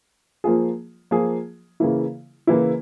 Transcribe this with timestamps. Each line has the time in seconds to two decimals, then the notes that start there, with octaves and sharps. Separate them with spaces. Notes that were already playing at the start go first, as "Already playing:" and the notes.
0.44 F3 A#3 F4 G#4
1.11 F3 A#3 F4 G#4
1.80 C#3 E3 A#3 E4
2.47 C#3 E3 A#3 E4